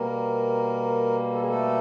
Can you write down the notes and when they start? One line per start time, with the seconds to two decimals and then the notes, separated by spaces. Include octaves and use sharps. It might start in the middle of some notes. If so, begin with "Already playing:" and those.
Already playing: B2 G3 A#3 A#4
1.33 A4
1.41 G#4
1.48 A3 A4